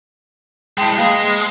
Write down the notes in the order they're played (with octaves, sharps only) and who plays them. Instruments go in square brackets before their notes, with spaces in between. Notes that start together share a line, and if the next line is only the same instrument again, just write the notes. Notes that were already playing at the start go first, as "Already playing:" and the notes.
[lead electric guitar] G#3 E4 [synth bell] G5 A5
[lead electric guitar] G#3 [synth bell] A#3 F5